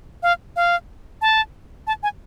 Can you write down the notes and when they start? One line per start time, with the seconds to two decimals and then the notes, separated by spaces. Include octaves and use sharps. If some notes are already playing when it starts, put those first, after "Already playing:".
0.23 F5
0.56 F5
1.22 A5
1.87 A5
2.03 G#5